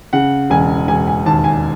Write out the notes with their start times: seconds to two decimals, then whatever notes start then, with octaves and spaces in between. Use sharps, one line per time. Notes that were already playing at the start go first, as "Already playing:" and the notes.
0.13 C#3 F#5
0.50 E1 G#5
0.88 E1 G#5
1.07 G#5
1.26 D#2 A5
1.44 G#5